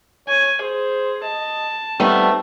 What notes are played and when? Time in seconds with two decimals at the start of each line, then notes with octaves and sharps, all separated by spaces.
0.28 C#5 G#5
0.61 G#4 C5
1.23 D#5 A5
2.00 D#3 F3 G3 A3 B3 C4